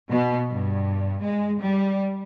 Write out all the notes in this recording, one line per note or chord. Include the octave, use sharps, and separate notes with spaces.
B2
G2
G#3
G3